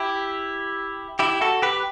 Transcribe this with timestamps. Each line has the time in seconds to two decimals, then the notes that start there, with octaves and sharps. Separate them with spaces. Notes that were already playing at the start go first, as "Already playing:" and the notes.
Already playing: E4 G4
1.19 E4 G4
1.41 F#4 A4
1.62 G4 B4